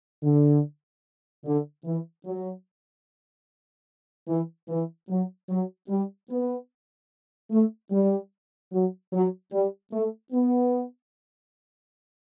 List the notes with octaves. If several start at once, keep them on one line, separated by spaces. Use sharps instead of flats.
D3
D3
E3
F#3
E3
E3
F#3
F#3
G3
B3
A3
G3
F#3
F#3
G3
A3
B3